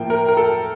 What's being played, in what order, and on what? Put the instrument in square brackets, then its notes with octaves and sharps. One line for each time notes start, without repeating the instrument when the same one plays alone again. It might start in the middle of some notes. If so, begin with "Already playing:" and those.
Already playing: [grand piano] A2 F3 A#3 G5
A#4
A#4
A4